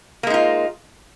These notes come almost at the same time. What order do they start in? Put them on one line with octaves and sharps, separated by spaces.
A#3 G#3 D#4 F4